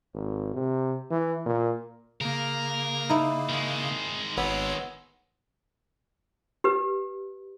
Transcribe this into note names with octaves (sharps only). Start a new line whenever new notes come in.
G#1
C3
E3
A#2
C#3 A#3 A#4
D#4 E4
D#3 G#3
G#1 B3 C#5 E6
G4 B4